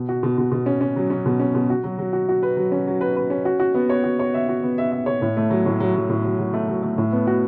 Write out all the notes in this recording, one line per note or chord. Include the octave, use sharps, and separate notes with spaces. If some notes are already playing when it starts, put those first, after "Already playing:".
Already playing: B2
F#4
B2
B2
B2
C#4
C#4
F#3
C#4
B2
C#4
B2
F#4
F#3
F#3
F#4
F#4
B4
F#3
C#4
F#3
B4
B4
C#4
F#4
F#4
B3
C#5
F#4
C#5
E5
F#4
B3
E5
E5
C#5
A2
A3
F#3
A2
F#3
F#3
A2
F#3
F#3
A3
F#3
A3
A2
B3
F#4